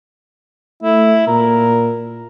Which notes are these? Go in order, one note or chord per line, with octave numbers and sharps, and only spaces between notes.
A3 E4
A#2 A#4